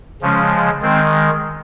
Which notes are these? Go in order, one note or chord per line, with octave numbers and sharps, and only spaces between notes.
C#3 F3 G#3 C#4
D#3 G#3 C4